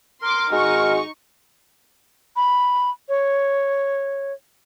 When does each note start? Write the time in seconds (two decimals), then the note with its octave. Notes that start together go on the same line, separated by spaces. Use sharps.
0.22 A#4 C6 D6
0.52 G#1 G#3 D#4 F#4 C#6
2.36 B5
3.09 C#5